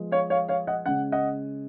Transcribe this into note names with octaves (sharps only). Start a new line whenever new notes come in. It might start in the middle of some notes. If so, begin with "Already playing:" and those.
Already playing: F3 G#3 B3
C#5 F5
C#5 F5
C#5 F5
D#5 F#5
C#3 G#3 C#4 F#5
D#5 F#5